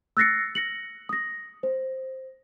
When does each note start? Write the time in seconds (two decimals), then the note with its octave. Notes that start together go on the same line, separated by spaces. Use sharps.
0.17 E6 F#6 A6 A#6 C7 C#7
0.55 A#6 C#7 F#7
1.09 D#6 A#6
1.63 C5